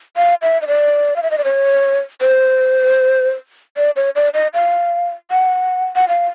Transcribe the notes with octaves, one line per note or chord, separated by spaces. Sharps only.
F5
E5
D#5
D5
F5
E5
D#5
D5
C#5
C5
D5
C#5
D5
D#5
F5
F#5
F#5
F5